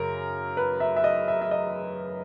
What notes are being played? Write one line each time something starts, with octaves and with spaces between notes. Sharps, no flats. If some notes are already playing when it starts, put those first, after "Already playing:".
Already playing: F#2 C#3 A#4
B4
E5
E5
D#5
E5
E5
D#5